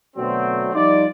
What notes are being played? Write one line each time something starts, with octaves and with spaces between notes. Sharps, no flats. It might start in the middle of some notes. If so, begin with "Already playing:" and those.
B2 D3 F#3 A3 C4
F3 G3 D#4 F4 D5